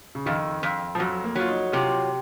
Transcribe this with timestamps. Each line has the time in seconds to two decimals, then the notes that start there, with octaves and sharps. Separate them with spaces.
0.15 C#3
0.26 F2 D#3
0.63 F2
0.95 F3
0.99 F2 F#3
1.24 A#3
1.35 F#3 F4
1.48 D#4
1.72 C3 F4